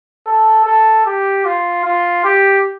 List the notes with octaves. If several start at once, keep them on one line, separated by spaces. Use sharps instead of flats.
A4
A4
G4
F4
F4
G4